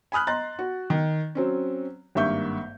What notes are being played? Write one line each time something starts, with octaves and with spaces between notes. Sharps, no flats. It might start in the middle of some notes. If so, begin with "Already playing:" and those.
G#5 B5 D#6 F6 F#6
D#5 A#5 C6 F#6 A6
F#4
D#3
F#3 C4 C#4
G#1 G2 A#3 E5 C#6 G6